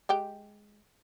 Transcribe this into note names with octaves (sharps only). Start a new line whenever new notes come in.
G#3 G4 G5